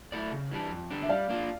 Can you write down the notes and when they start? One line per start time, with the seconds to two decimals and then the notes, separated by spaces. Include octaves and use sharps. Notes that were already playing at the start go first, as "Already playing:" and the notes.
0.12 A3 E4 A4 D5
0.31 C#3
0.51 E3 G3 D4
0.71 F2
0.90 D3 G3 D4
1.02 E5
1.09 G3 D5 F5
1.29 A#3 D4 F4